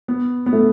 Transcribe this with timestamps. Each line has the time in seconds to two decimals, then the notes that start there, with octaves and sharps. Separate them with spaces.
0.08 B3
0.46 B3
0.53 A3